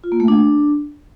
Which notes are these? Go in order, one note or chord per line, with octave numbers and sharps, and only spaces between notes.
F4
A#3
A3
D4